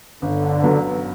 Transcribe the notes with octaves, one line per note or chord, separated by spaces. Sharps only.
G1 D3
G2 F#3 B3